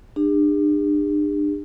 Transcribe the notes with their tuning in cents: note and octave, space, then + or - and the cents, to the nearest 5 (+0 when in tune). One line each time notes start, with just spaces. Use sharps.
D4 +35 G#4 -45